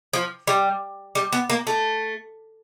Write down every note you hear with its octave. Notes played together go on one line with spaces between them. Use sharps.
F3
G3
G3
B3
A#3
A3